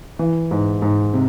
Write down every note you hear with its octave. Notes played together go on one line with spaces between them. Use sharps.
E3
G#2
G#2
C3